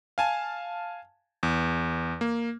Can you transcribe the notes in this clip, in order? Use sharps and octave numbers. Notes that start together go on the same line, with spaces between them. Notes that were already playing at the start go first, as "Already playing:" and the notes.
F5 G#5 A5
E2
A#3